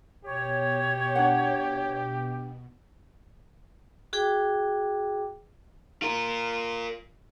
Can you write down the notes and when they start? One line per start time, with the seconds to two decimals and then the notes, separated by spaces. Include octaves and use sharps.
0.24 B2 G4 C#5
1.15 D4 F#5
4.13 F#4 G#4 G5 D6
6.02 F4 A#4